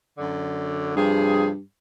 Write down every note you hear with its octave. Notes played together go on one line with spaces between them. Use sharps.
F#2 D3
G2 C3 F3 G#4